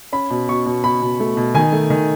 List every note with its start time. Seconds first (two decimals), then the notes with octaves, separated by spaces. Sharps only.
0.12 C#4 B5
0.30 B2
0.49 B2 C#6
0.66 B2
0.84 B2 B5
1.02 B2
1.20 A3
1.37 B2
1.54 D#3 G#5
1.73 A3
1.90 D#3